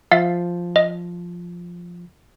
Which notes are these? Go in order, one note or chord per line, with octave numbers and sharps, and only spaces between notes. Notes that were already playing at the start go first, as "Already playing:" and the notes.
F3 E5 F5 A6
D#5